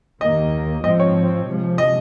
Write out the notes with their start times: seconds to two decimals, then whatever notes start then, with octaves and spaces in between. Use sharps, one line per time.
0.21 D#2 D#3 A#3 D#5
0.84 G#2 F3 C4 D#5
1.00 C#5
1.47 C3 F3 G#3
1.78 D#5